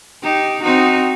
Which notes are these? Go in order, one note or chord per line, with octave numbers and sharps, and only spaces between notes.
D#4 G4
C4 D#4 F#4